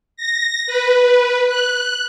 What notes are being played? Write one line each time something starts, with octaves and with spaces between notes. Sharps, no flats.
A#6
B4
F#6